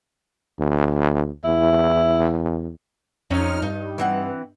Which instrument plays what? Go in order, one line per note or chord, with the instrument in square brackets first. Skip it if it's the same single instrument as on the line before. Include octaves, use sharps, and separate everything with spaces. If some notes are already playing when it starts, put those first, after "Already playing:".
[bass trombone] D2
[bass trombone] E2 [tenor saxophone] E4
[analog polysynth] F2 D#4 F6 [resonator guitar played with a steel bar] F#3 C4 C#4
[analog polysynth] G2 [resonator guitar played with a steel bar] D#4
[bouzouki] E3 C4 F#5